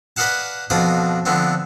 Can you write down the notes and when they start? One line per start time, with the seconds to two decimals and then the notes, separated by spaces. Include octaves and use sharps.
0.16 B4 D5 D#5 F5 F#5 A5
0.70 F2 B2 F3 D4 D5 D#6
1.25 D3 F3 B3 C4 D4